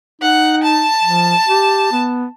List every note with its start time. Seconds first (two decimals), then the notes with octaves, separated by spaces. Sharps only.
0.22 D#4 F#5
0.63 A5
1.04 F3
1.48 G4
1.92 B3